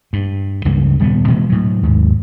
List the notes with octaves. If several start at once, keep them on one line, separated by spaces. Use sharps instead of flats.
G2
C#2 G2 C#3 A#3
D#1 G3 A3 B3
B2 E3 G#3 A#3
A2 F#3
D#2 G#2